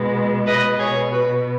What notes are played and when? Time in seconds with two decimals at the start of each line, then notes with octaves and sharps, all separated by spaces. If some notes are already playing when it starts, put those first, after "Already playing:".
Already playing: B2 G#3 B3
0.46 B4 D#5
0.78 B2 B3 G#4 C#5
1.11 F#4 B4